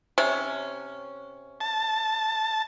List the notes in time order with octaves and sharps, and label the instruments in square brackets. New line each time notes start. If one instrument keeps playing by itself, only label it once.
[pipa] C3 C#4
[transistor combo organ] A5